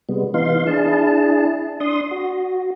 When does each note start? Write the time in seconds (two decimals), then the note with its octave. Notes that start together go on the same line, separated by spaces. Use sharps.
0.09 C3 G3 G#3 B3
0.34 E3 B3 D#4 F5 C6
0.67 D4 E4 G#4 A5
1.80 D4 C6 D#6
2.11 F#4